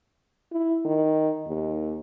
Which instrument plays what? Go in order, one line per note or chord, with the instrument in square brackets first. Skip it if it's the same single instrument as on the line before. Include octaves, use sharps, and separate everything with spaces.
[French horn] E4
D#3
D#2